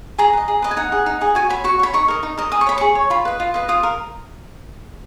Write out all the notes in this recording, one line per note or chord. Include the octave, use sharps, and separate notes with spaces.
G#4 A#5
B4
D#5
G#4
B4 D#5
G#5
D#4 F#5
G#4 D#5
D#4
G#4 D#5
F#4 G#5
C#5 B5
F#4 C#6
C#5 B5
D#4 C#6
A#4 D#5
D#4
A#4 D#5
G#4 D#6
C#6
C#5 B5
G#4 C#6
C#5
F4 B5
B4 D#5
F4
B4 D#5
F4 D#6
A#4